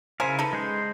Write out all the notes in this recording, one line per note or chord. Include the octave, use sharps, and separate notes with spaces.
C#3 E4 A#4 C5 F5 G#5
D#4 A4 B4
G#3 C5